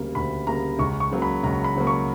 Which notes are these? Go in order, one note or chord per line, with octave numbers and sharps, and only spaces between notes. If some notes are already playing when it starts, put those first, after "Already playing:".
Already playing: D2 C#3 G3 A#3
D2 B5
C#3 G3 A#3 A#5
C#2 C#6
C#6
C#3 F#3 A#3
B5
C#2 A#5
B5
C#3 F#3 A#3
C#6